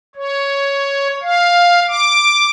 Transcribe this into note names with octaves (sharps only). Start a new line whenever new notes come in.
C#5
F5
D6